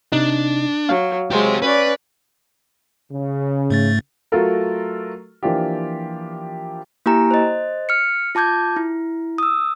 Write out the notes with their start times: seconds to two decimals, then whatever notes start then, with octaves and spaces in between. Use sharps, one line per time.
0.12 C3 D4 D#4
0.89 F#3 F5
1.31 F#3 G#3 G4 C5
1.62 C#4 B4 D5
3.12 C#3
3.70 G#2 A3 A6
4.32 F#3 A3 F4 F#4 A4 A#4
5.43 E3 F3 A#3 D4 F4 G4
7.06 A#3 E4 G4 G#5 A#5
7.31 C5 D#5
7.89 F6 C#7
8.35 F4 A5 D6 G6 G#6
8.76 E4
9.38 D#6 E6